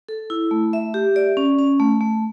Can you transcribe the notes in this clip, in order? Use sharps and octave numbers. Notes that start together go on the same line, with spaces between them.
A4
E4
A3
E5
G4
D5
C#4
C#4
A3
A3